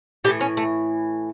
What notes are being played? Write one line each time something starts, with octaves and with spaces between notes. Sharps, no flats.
A2 E3 A3 G4
C#4
A3